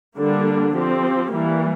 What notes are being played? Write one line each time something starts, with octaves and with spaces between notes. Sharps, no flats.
D3 G3 A#3 D4
F3 C4 G4
E3 G3 A#3